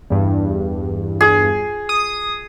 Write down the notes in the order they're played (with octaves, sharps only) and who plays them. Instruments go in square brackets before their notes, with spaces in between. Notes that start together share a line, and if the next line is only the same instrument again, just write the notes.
[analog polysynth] E2 G2
[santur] G#4
[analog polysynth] D#6